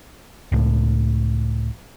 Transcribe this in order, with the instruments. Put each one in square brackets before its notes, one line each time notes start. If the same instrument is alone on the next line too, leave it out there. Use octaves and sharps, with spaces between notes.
[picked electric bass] C#2 A2